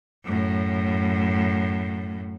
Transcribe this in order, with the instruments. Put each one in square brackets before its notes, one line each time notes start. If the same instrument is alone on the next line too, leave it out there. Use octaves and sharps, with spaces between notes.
[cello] F#2 A2